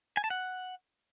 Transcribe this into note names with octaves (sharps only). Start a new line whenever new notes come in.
G#5
A5
F#5